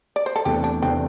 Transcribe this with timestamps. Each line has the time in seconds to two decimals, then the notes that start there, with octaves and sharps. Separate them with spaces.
0.16 D5
0.26 C5
0.36 A4
0.45 E2 C3 A3 D4 G4
0.64 D4
0.82 E2 C3 A3 C4 D4